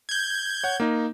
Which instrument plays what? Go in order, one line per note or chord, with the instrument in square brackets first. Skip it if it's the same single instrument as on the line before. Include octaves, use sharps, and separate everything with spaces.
[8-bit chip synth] G6 G#6
[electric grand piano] C#5 F#5
A#3 D#4